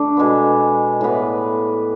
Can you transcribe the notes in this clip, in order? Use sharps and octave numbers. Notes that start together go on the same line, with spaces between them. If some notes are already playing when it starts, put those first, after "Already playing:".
Already playing: D3 A3 D4
B2 G#3 B3
A2 E3 B3